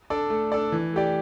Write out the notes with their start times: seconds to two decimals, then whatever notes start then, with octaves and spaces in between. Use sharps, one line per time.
0.10 D4 A4 D5
0.30 A3
0.52 D4 A4 D5
0.72 E3
0.93 A3 G4 D5